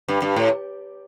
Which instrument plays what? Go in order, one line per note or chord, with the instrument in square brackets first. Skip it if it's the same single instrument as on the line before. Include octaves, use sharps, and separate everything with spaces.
[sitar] G2
G2
A2